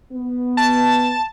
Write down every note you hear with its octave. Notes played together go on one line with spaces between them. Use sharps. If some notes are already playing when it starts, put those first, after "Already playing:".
B3
A5